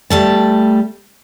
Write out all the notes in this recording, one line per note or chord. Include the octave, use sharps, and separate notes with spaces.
G3 A3 A5